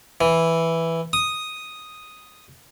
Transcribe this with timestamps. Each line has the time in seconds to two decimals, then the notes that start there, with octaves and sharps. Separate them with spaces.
0.21 E3
1.13 D#6